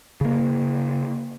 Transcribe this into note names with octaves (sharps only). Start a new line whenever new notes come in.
C#3 A#3